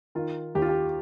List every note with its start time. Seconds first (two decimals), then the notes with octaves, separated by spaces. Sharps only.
0.15 D#3 F4
0.55 D#2 G4
0.62 F4
0.69 G4